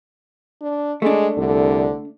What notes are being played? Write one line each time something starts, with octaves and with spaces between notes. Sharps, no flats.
D4
G#3 A3 D4
C2 D3